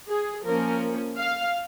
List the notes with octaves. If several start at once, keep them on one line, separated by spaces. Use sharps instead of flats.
G#4
F3 A#3 C#4 A#4
F5